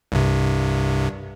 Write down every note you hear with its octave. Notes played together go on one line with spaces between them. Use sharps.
C2 G2 C3